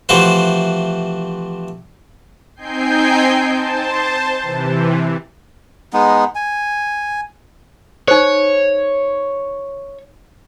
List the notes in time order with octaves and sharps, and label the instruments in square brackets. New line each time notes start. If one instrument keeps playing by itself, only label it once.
[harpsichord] C3 E3 F3 A3 F#4 C5
[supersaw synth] C4 D#4 G5 G#5 G6 C7
C5 A5
C3 E3
[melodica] G#3 B3 D#4
G#5
[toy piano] D#4 C5 [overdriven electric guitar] C#5